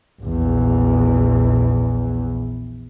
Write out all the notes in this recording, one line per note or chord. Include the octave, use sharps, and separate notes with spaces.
A#1 E2